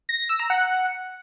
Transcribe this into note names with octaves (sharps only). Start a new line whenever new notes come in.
A#6
A#6
E6
A#5
F#5